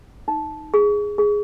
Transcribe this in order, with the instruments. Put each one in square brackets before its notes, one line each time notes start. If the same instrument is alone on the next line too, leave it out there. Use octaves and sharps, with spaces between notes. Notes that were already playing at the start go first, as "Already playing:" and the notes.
[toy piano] D#4
G#4
G#4